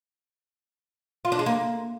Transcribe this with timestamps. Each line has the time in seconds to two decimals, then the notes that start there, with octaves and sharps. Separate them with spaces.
1.25 F4
1.32 D4
1.39 G#3
1.46 A#3